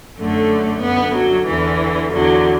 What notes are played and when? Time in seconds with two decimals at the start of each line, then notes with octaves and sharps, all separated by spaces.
0.18 F#2 D3 A3
0.82 F#2 D3 B3
1.15 F#3
1.47 E2 D3 E3
2.11 E2 D3 F#3